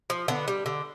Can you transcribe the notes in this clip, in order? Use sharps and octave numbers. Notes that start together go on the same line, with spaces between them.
F3
D3 B3
G3
D3